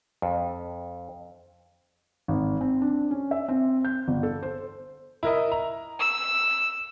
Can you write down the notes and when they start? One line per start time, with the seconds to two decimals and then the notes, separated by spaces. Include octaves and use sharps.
0.22 F2
2.28 G#1
2.61 C4
2.82 D4
3.11 C#4
3.31 E5
3.48 C4
3.85 G6
4.08 G1
4.23 A4
4.43 C5
5.23 E4 A#4 D#5
5.52 A#5
6.00 E6